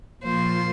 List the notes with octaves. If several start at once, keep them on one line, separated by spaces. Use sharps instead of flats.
A#2 F3 A#3 F4 C5